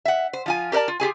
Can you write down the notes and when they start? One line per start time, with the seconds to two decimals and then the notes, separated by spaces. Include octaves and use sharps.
0.05 E5 F#5
0.33 C5
0.46 F3 F4 G#5
0.72 G4 A#4 C5 D5 A5
0.88 F4
1.00 F4 G4 G#4 G#5